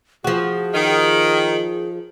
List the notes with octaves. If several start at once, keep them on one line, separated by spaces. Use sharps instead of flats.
F3 F#4 G#4
D#3